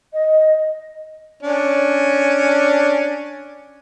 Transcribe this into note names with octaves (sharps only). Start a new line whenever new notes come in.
D#5
C#4 D4